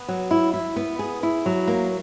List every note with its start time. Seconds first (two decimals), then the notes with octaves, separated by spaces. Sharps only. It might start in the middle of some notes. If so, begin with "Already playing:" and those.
Already playing: B3
0.08 F#3
0.31 E4
0.53 E4
0.76 B3
0.99 G#4
1.23 E4
1.46 F#3
1.67 A#3